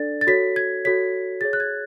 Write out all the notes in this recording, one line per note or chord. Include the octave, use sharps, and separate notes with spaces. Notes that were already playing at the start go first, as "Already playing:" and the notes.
Already playing: D4 A4 D5 A6
A6
F#4 A4 C#5 B6
G#6
F#4 A4 C#5 B6
G#4 C#5 A6
F#6
G#6